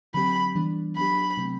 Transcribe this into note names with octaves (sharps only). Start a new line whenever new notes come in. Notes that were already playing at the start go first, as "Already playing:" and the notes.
D3 F#3 C4 G4 B5
E3 G3 B3 D4
F#3 B3 D4 G4 B5
C3 F#3 A3 C4